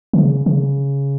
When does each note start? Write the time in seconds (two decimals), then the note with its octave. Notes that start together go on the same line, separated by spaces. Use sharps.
0.13 D3
0.18 C#3
0.46 C#3